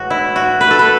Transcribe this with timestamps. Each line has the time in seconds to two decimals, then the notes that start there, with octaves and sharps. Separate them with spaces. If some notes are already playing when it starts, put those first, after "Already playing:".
Already playing: A2 E3 G#3 F#4
0.10 E4
0.36 F#4
0.61 B4
0.71 A4
0.79 B4